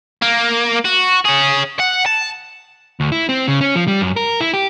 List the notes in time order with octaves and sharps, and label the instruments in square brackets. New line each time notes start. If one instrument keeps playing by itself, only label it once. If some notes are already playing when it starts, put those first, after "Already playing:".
[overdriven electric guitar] A#3
F#4
C#4 G#4
F#5
A5
[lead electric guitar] D2
E4
C4
C#3
C#4
F3
G3
F#2
A#4
E4
G4